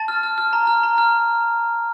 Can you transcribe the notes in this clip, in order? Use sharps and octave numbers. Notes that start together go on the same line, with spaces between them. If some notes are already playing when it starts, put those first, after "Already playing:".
Already playing: A5 A6
F6
F6
F6
A#5
F6
A#5
F6